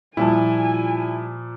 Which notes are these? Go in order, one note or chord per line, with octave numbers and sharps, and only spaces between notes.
A#2 F3 G3 E4 G#5 A5